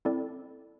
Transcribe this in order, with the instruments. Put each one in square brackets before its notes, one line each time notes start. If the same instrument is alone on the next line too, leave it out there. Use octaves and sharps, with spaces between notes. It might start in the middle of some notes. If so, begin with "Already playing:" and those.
[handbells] C4 E4 A4 D5